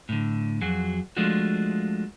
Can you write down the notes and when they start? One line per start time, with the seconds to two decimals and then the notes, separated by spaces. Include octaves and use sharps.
0.09 A2 D3
0.61 F2 F#3 F#4 G#4
1.17 F3 G#3 A3 D4 F4 F#4